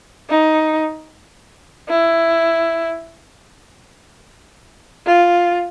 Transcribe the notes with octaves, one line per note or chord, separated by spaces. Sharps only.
D#4
E4
F4